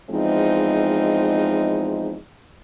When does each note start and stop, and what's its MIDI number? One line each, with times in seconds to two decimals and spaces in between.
0.10 2.16 40
0.10 2.16 53
0.10 2.16 56
0.10 2.16 60
0.10 2.16 63